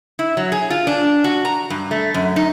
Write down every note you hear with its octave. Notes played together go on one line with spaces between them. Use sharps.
E4
F#3
G#4
F4
D4
F#4
A#5
G2
A3
F#2
D#4